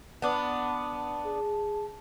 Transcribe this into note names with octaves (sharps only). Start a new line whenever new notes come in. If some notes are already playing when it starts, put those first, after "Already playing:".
B3 D4 A5
G#4